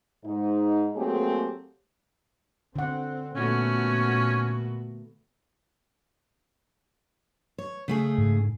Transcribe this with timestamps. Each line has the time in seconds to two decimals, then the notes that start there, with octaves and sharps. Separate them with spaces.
0.24 G#2 D#4
0.95 F#3 A3 A#3 C4 G4 G#4
2.76 D3 C4 F#5
3.35 A#2 A3 B3 C#4 F#4
7.58 C#5
7.88 C#3 A3 G#4
8.18 G#2